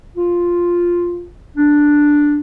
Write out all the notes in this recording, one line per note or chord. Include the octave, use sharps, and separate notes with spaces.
F4
D4